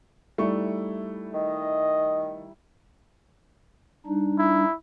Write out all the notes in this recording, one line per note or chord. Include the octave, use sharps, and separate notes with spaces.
G3 A3 D#4 E4 C#6
D#3 D#5
G3 D4 D#4
E4